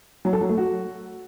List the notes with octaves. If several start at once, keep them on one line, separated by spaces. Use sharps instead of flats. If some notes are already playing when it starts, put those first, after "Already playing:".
F#3
A4
F#3
A3
F#4